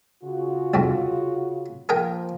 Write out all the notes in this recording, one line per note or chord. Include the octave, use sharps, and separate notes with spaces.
C#3 F4 F#4
C2 F2 G#2
F3 A#3 G#4 A#4 G5